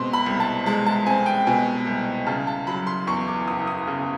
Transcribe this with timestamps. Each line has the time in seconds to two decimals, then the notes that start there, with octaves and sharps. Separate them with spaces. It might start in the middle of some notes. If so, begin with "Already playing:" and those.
Already playing: B2 G#3 C4 C6
0.13 B5
0.26 C2
0.40 A5
0.66 G#3 A5
0.86 A5
1.06 C4 G#5
1.26 G5
1.47 B2 G#5
1.87 C2
2.27 C#3 A5
2.47 A5
2.67 F#3 B5
2.87 C6
3.07 E2 C#6
3.28 D6
3.47 F#1 D#6
3.67 D#6
3.87 C#3